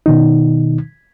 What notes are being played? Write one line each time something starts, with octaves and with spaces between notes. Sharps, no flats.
B2 D#3 D#4